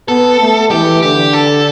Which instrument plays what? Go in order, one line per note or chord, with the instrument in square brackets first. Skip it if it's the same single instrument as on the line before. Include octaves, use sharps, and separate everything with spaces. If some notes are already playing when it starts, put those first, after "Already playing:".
[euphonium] B3 [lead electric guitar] A4
[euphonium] A3
[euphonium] E3 [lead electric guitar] G4
[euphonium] D3 [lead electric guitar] G4
[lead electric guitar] A4